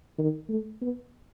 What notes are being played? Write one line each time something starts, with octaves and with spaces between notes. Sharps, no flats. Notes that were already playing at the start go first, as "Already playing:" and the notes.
D#3
A3
B3